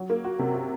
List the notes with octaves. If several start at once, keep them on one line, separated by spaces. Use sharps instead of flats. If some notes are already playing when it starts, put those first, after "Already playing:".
Already playing: F#3
A#3
F#4
C3
F#4